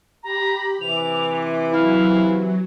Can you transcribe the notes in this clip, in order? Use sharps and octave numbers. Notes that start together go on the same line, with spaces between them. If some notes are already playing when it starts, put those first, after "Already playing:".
G4 A#5 B5
C3 E3 D6 F7
F#3 E4 F5